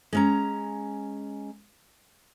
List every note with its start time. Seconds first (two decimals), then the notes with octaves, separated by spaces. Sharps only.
0.13 G#3 C#4 A#5